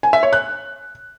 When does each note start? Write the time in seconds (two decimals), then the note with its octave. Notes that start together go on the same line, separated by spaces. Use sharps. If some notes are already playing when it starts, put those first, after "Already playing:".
0.03 G#5
0.13 E5
0.23 C#5
0.33 F#6